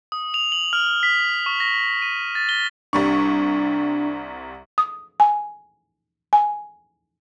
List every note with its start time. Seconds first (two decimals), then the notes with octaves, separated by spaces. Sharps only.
0.12 D#6
0.34 F7
0.52 F#7
0.73 F6
1.03 B6
1.46 C#6
1.60 A#6
2.02 D#7
2.35 A6
2.49 G7
2.93 C2 G3 D4 C#6
4.78 D#6
5.20 G#5
6.33 G#5